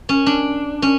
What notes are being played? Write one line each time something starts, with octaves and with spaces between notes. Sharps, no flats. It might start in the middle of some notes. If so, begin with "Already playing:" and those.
C#4
D4
C#4